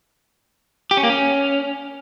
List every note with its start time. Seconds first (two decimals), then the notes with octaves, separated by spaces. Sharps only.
0.91 G4
0.97 C#4
1.03 A#3
1.10 C#4